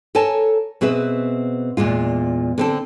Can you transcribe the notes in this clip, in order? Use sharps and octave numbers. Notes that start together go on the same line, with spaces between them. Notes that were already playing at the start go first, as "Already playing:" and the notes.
A4 A#4 C#5 G#5 A5
B2 C4 G#4 B4 E5
E2 A#2 G#3 F4
D3 C4 A4